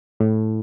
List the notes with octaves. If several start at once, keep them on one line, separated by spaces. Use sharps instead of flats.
A2